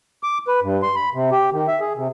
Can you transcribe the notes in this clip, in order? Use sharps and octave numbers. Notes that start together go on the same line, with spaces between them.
D6
B4
G2
C6
B5
C3
G4
D#3
E5
G#4
C3